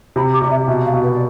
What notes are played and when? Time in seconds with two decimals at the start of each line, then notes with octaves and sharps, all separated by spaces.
0.16 C3 B5
0.33 D6
0.42 C3 D5
0.50 E5
0.68 B2 E5
0.85 F5
0.94 B2
1.02 B4
1.11 D5